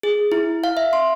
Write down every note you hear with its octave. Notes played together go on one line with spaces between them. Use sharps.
G#4
E4
F5
E5
C6